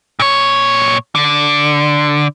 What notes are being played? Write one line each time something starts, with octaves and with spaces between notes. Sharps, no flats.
A#2 C#5
D3